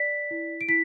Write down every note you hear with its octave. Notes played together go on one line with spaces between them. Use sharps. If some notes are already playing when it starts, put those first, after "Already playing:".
Already playing: D5 B6
E4
D7
E4 B6